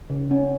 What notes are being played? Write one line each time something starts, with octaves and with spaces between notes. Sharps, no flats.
C#3
C#4